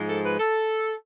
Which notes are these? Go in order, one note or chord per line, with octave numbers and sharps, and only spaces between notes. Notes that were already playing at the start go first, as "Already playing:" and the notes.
Already playing: G#2 F3 G#3
A4
B4
A4